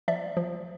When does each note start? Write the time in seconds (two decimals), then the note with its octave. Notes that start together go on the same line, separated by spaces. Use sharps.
0.08 F3 D5 E5
0.37 F3